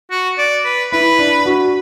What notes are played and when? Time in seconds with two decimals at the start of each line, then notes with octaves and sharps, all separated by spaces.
0.11 F#4
0.38 D5
0.65 B4
0.92 E4 B4
1.19 D4
1.45 F#4